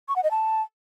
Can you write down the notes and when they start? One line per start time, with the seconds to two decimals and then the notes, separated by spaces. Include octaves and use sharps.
0.08 C#6
0.16 F#5
0.23 D#5
0.31 A5